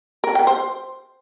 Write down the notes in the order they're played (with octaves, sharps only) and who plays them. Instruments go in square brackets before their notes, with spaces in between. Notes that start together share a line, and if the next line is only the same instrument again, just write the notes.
[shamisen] A#4
G5
C5